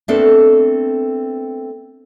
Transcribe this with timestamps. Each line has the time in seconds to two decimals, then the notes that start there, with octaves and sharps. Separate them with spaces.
0.08 A3 B3 C4 D4 A4 A#4